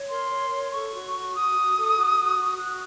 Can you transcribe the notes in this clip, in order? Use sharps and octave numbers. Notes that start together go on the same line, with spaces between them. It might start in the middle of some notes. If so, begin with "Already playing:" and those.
Already playing: C#5
A#4 C6
C#5
C#5
A4 C#6
F#4
F#4
F#4 D#6
F#4
A4
F#4
F#4
F#4
F#4 F#6